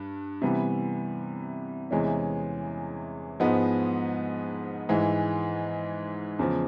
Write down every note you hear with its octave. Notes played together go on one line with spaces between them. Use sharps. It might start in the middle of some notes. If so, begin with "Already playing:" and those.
Already playing: G2
C3 E3 G3 B3
E2 C3 E3 G#3 C#4
G#2 F3 G#3 B3 D#4
G#2 E3 G#3
E2 C#3 F3